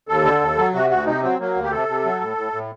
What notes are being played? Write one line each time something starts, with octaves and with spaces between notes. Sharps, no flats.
D#2 A4
D3
D#2
F#3
C3 F#4
D2 F#4
C3 D#4
F#3 C4
F#3 A#3
D2
G4
C3 A4
C3
F#3
A2
A2
A2